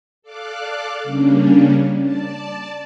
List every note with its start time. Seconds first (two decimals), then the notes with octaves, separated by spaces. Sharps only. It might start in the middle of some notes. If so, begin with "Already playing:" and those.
0.22 A4 D5 F5 D6 F#6
1.03 C#3 G3 A#3 C#4 D4
2.00 D5 A5